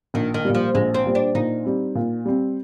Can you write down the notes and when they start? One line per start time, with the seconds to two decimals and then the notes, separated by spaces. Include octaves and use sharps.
0.14 A#1 D#3
0.34 D#3
0.45 A#2 G3
0.55 F3
0.75 A#1 G#3
0.94 C4
1.05 A#2 G3
1.15 D4
1.35 A#2 D#4
1.65 G3 C4
1.95 A#2
2.25 G3 C4